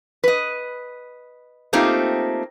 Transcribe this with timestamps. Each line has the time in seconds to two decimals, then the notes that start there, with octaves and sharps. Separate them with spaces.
0.24 B4 D#5
1.73 A3 A#3 C4 D#4 F4 G4